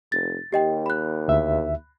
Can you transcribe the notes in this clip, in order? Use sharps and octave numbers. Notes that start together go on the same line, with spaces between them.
F1 A6
D#2 G4 D#5 G5
B5 F#6
D2 E5